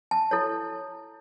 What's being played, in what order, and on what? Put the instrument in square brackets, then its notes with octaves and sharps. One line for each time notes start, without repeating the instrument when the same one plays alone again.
[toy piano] A5
E4 A4 C#5